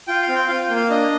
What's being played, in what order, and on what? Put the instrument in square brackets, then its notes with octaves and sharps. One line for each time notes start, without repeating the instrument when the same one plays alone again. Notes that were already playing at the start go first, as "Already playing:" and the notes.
[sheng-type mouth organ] F4 G5
F5
C4
G5
F4 F5
G5
A#3
F5
D4 D#5